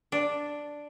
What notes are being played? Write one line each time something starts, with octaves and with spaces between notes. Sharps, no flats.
D4